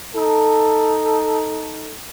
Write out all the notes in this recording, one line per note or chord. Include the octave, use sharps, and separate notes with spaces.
D#4 A4